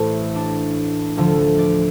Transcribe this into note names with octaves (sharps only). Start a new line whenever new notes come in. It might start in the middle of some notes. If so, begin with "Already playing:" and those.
Already playing: A1 A2 A3 C5
D4
D2 D3 F3 F4
D5